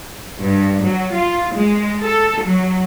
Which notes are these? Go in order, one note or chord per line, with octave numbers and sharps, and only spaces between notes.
G2
F#3
F4
G#3
A4
F#3